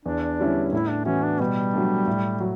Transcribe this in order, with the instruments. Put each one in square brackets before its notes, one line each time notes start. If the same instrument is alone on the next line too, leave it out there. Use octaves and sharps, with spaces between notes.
[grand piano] E2 [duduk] D4
[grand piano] D3 G3 C#4 E4
[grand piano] A2 [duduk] E4
[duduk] D4
[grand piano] E3 B3 F#4 [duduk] C#4
[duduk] D4
[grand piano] B2 [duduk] G3
[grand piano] F#3 A3 D4
A2
F#3